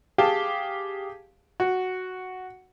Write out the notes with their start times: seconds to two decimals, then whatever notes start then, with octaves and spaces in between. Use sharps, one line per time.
0.18 G4 G#4 F5 A5
1.60 F#4